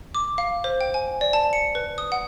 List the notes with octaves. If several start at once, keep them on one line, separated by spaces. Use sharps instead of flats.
D6
F5
C5
G5
G#5
D5
A5
C#7
B4
D#6
F#5